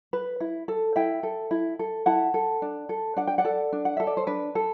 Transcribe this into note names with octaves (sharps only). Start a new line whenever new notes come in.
B4
E4
A4
E4 E5 G5
A4
E4
A4
E4 F#5 A5
A4
D4
A4
D4 F#5
G5
D5 F#5
A4
D4
F#5
A4 E5
D5
C5
D4 B4
A4